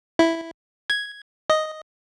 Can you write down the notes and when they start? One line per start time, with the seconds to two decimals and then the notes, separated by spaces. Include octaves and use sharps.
0.19 E4
0.90 G#6
1.50 D#5